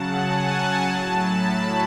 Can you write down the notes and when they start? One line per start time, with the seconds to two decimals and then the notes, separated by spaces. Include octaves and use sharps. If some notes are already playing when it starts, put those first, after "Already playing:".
Already playing: C#3 F#3 F#5 A5
0.13 G#5
0.47 A5
0.83 A2 F#3 A5
1.19 B5